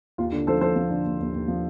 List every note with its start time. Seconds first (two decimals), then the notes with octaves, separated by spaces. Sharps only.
0.18 D#2 F4
0.32 D3
0.47 F3 A4 C5
0.61 F3 A4 C5
0.76 F3
0.90 D3
1.05 D#2
1.20 D#2
1.34 D#2
1.48 F3